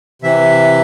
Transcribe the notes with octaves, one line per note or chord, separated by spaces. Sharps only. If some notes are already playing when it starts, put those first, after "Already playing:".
C3 E3 E5